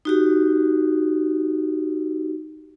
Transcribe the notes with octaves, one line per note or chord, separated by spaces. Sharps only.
D#4 F#4 G4